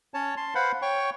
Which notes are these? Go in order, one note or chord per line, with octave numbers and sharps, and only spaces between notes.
C#4 C#5 A5
A5 C6
B4 C5 F5 F#5 B5
C#5 G5 C#6